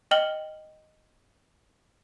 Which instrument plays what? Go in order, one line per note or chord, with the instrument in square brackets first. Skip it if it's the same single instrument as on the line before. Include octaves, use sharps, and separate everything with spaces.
[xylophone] D#5 G5 F6 F#7 G7